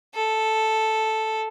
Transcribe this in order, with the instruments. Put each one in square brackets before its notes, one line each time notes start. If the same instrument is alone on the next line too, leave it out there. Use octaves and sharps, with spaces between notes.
[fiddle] A4